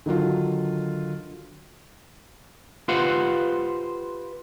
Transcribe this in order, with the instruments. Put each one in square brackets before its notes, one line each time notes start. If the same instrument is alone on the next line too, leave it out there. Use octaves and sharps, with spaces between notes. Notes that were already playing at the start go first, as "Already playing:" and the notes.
[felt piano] D3 D#3 F#3 F4
[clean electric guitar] F4 G4 B4 C5 F5 F#5